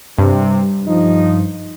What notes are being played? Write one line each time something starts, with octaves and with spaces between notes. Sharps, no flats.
G2 C3
F3 D#4